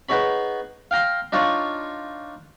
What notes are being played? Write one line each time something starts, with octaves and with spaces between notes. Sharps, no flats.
B3 D#4 G#4 C#5 B5
F5 G5 A#5 C6
D4 D#4 F4 C#5 C#6